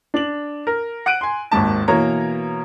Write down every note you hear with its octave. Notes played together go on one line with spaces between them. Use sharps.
D4 F#7
A#4
F#5 F#6 D7 D#7
G#5 C6
G#1 D#2 G#2 A5
B2 E3 A#3 C#5 A#5